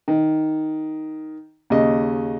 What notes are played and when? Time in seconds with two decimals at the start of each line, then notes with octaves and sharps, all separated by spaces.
0.08 D#3
1.70 D#2 C#3 D#5